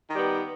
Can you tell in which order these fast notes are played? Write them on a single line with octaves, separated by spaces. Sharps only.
D#3 G3 B3